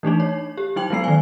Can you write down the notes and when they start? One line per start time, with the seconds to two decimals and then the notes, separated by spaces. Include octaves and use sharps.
0.03 E3 A3 D4 D#4
0.20 C#5
0.58 G4
0.76 F#3 D#4 G5 F#7
0.90 F#3 G#3 B3 C7
1.04 D#3 G#5